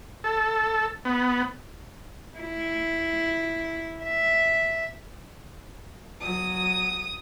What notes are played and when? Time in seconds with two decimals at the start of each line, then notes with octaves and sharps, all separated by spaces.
0.24 A4
1.05 B3
2.38 E4
4.05 E5
6.22 F#3 D#6